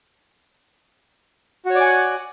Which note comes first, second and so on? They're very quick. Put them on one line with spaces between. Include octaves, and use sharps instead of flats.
F#4 C#5 D5 G#5 F#5